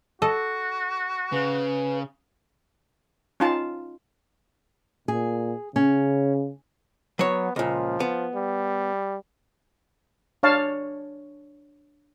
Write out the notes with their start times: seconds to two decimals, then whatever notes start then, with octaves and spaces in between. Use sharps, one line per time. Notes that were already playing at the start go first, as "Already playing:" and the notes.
0.22 F#4 A4 D#5
1.32 C#3 B4
3.40 C#4 D#4 F4 F5 A5
5.08 A#2 G#4
5.76 C#3 C#4
7.19 F#3 B3 C#5
7.56 C#2 A#2 F3
8.00 B3
8.35 G3
10.43 D4 C#5 F5 A5